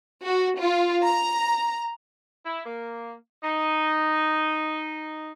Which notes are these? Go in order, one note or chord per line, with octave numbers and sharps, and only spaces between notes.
F#4
F4
A#5
E4
A#3
D#4